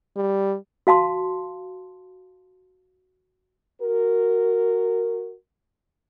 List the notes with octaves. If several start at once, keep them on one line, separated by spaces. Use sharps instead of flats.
G3
F#4 F5 A5 C6
F#4 A#4